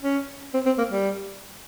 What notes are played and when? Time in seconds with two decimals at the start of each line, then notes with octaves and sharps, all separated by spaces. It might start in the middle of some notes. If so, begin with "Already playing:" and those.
0.03 C#4
0.54 C4
0.66 C4
0.78 A#3
0.91 G3